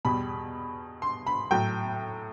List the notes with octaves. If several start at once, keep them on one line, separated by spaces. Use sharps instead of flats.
E2 B2 G3 B5
C6
B5
A2 F#3 G5